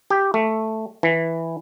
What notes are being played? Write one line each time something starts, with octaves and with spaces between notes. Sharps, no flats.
G4
A3
E3